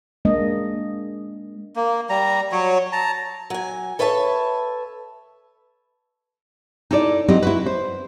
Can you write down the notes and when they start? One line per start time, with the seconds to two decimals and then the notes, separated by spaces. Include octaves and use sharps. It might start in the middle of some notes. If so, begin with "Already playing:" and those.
0.25 G#3 A#3 D4 D#5
1.76 A#3
2.10 G3 A#5
2.52 F#3 C#5
2.93 A5 A#5
3.50 F#3 G#5
3.99 A4 B4 C#5 E5 F#5 A5
6.91 D#4 E4 A4 C#5 D5
7.28 F#3 C4 E4 G4 D#5
7.42 E4 F#4 B4
7.66 C5